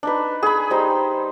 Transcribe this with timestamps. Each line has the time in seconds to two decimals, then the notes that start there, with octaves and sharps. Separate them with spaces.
0.03 D4 D#4 B4
0.43 G#4 B5
0.70 G3 D#4 C5